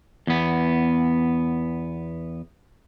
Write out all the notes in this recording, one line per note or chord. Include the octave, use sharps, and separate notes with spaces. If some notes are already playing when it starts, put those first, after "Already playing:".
E2 B3